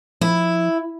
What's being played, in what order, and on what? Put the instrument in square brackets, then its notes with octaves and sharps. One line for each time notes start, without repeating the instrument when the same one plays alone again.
[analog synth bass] F3 [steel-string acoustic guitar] E4